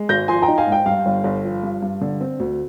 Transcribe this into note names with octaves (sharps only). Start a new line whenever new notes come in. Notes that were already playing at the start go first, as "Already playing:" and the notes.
Already playing: G#3
G#1 G6 A#6
F3 G#5 C6
G5 A#5
D#4
F5 G#5
G#2
G5
G2 F5
G1
G1
F3
G2
G2
D3
C4
D2